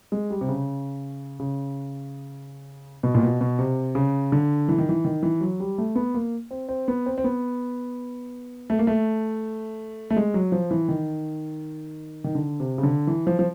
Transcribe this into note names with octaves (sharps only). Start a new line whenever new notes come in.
G#3
G3
C3
C#3
C#3
B2
A#2
B2
B2
C3
C#3
D3
E3
D#3
E3
D#3
E3
F#3
G3
A3
B3
A#3
C4
C4
B3
C4
C4
B3
A3
A#3
A3
A3
G#3
F#3
F3
E3
D#3
D#3
D3
C3
C#3
D3
E3
F3
F3